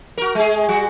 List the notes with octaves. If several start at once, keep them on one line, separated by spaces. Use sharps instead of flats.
F#4 A#4
G#3 G#4
G3 F#4